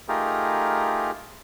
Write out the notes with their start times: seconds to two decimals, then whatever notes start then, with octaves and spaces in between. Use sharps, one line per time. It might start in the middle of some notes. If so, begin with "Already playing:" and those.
0.08 A3 D#4 F4 G4 G#4 A#4